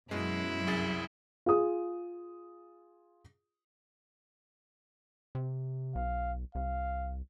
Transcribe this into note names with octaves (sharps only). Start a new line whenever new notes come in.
F#2 B2 G#3 E4
C2 G#4 A6
F4 G#4 D#6
C3
B1 F5
C2 F5